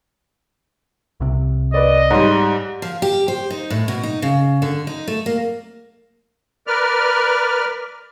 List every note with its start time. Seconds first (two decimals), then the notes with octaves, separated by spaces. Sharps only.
1.20 C2 C3
1.74 B4 D5 D#5
2.10 G#2 G3 C#5 C6
2.82 F3
3.02 G4
3.28 C5
3.51 D#4
3.70 A2
3.88 B2
4.03 D#4
4.22 C#3
4.62 D3
4.87 D#4
5.08 A3
5.26 A#3
6.67 A#4 B4 D5 F6